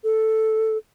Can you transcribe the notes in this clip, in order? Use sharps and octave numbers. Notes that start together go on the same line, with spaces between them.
A4